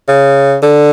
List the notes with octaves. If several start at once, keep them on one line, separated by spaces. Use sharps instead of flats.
C#3
D3